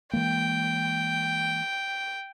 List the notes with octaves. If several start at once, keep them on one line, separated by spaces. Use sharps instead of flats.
E3 G#3 A#3 G5